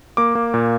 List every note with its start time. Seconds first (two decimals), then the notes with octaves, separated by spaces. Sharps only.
0.17 A#3 D6
0.35 A#3
0.54 A#2